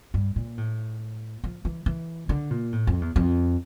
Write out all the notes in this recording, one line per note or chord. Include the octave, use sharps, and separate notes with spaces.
G2
A#2
A2
F3
E3
E3
D3
A#2
A2
F2
E2
F2